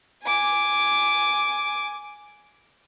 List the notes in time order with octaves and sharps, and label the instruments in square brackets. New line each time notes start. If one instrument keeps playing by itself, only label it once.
[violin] G#5 D6